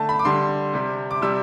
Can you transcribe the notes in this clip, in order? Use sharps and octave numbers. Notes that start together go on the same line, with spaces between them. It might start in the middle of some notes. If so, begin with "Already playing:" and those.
Already playing: D3 A3 A5
B5
D6
D3 G3 C6
C3 G3
D6
C3 G3 E6